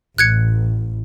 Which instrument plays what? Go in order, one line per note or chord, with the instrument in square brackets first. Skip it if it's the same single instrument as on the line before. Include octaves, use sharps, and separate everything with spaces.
[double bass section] A1 [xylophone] F#6 G#6 C#7